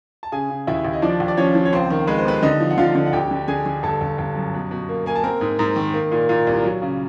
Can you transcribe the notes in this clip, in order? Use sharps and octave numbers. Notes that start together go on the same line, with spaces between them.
A5
C#3 G#4 G#5
C#3
D#2 E4 E5
D#2
D#5
F3 D4 D5
D#2
D5
F3 C#4 C#5
F3
C#5
C#2 C4 C5
D#3
G#3 B4
C5
C3 B3 B4
D3 D#4 D#5
F3
F#5
D3 F4 F5
D3
F#5
D2 G4 G5
D3
D3 G#4 G#5
D3
G1 A4 A5
G1
G1
F#2
B2
B2
A#3
A#3 G#5
A5
C4 A#4 A#5
G#2
G#2
D#3
A#3
A#2
A#2
C2
F#3
C#3